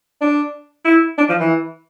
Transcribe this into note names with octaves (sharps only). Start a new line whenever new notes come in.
D4
E4
D4
F3
E3